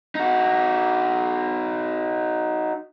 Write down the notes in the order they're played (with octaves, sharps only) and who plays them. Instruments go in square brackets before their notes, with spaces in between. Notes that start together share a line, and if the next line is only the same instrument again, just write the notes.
[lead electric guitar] D#4 F#4